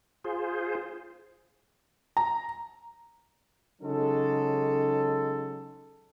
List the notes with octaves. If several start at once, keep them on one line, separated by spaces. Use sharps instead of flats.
F4 G#4 C5
A#5
C#3 F#3 G#3 D#4 A4